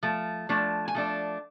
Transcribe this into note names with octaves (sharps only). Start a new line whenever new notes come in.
F3 A3
F3 A3 D4
G#5
F3 A3 D4